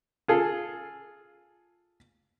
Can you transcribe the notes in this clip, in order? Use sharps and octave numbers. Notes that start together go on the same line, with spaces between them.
F4 G#4 A4